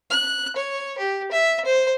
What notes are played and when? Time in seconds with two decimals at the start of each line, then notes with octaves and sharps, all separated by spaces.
0.11 F#6
0.56 C#5
0.98 G4
1.32 E5
1.65 C5